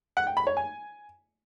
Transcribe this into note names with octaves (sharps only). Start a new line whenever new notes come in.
F#5
G5
B5
C#5
G#5